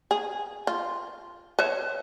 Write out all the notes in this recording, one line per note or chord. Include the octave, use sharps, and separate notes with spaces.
G#4
F4
B4 C#5 E5